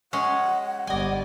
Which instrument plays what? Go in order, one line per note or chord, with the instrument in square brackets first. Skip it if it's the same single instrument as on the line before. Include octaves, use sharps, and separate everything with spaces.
[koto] G#3 C#4 [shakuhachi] F#5
[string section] G1 G3 D5 [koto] D#5 G#5